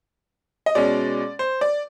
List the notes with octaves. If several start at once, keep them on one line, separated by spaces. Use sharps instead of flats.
D#5
B2 G#3 C#4 D5
C5
D5